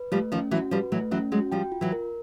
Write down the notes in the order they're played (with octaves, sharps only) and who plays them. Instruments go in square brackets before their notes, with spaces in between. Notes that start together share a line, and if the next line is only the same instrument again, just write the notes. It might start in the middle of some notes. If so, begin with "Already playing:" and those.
Already playing: [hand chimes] B4
[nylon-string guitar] F3 G3 [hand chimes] A3
[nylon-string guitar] D#3 F3 [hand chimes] C#4
[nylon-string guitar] E3 F#3 [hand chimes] F#4
[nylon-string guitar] F3 G3 [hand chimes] B4
[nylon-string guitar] E3 F#3 [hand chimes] A3
[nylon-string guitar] E3 F#3 [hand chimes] C#4
[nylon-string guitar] F#3 G#3 [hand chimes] F#4
[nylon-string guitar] F3 G3 [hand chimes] G5
[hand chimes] F4
[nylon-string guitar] E3 F#3
[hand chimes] A#4